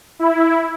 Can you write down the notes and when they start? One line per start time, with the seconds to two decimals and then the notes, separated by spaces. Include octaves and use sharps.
0.19 E4